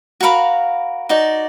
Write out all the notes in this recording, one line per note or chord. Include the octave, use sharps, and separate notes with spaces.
F#4 A#4 F5 B5
D#4 F#4 D5